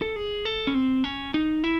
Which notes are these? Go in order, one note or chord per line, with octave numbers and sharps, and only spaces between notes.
A4
G#4
A4
C#4
C4
C#4
D#4
E4